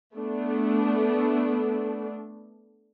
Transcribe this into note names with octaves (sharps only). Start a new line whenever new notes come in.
A3 B3 D4